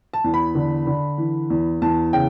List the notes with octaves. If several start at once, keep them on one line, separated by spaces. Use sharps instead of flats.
A5
E2
B5
D3
D3
E3
E2
E2 A5
C#3 G5